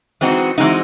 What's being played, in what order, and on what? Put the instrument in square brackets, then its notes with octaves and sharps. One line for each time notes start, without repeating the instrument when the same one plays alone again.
[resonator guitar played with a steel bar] E3 G#3 C4 D#4 F#4
E3 G#3 C4 D#4 F#4